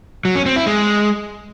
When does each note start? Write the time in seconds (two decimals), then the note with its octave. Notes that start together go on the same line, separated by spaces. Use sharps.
0.25 F#3
0.35 C#4
0.46 C4
0.56 E4
0.67 G#3